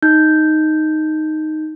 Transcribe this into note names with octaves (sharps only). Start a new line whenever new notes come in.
D#4 G6